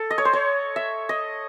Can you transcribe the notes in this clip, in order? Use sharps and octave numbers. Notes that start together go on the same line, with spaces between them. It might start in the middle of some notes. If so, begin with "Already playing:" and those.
Already playing: A4
D#5
C#5
C5
C#5
E5
D#5